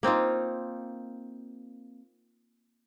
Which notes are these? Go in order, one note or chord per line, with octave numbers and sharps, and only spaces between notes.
A#3 C4 D#4 F4